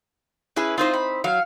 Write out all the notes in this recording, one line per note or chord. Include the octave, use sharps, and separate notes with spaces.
C#4 E4 G#4 B4
C4 D#4 F4 C5 D#5
B5
F#3 F5